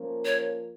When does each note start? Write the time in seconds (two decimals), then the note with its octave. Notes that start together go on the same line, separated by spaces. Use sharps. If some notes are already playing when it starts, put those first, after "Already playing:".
Already playing: F3 A#3 C#4 F4 A#4
0.25 C#5